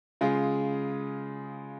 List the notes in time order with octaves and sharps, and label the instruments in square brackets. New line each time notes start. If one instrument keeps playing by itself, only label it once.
[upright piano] C#3 G#3 F4 G#4